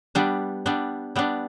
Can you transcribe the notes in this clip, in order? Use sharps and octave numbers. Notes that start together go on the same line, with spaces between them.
G3 B3 D4
G3 B3 D4
G3 B3 D4